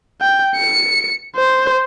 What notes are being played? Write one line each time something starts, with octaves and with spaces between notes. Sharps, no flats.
G5
C#7
C5